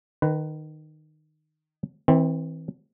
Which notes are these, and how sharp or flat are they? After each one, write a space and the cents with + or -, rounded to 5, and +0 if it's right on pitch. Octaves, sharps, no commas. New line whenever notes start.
D#3 -15 B4 +10
E3 -35 C4 +0